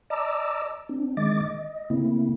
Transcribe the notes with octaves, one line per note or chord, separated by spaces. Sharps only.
D5 D#5 A5 A#5 D6 E6
C4 D4
D#3 G#3 D#5 D6 A6
D#5
C#3 A3 A#3 C4 E4